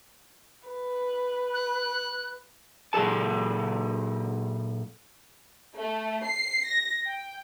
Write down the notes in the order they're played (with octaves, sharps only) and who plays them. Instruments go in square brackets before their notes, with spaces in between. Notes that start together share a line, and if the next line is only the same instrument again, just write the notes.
[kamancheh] B4
[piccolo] F#6
[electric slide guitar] A#2 F#3 G#4 A4 A5
[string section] A3
C7
A#6
G5